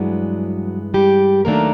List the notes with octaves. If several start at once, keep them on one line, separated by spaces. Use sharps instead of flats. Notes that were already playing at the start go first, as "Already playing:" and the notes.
Already playing: G2 E3 F#3 G#3 B3 D4
G3 G4
D#2 D#3 F#3 A3 A#3 D4 A#4